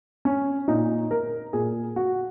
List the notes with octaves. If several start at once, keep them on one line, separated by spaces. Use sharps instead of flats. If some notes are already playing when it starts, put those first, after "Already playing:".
C#4
A#2 D#4
A#4
A#2 G#4
F#4